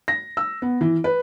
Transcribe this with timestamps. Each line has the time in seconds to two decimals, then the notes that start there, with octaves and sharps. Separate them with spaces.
0.08 A#6
0.37 E6
0.62 B3
0.81 E3
1.04 B4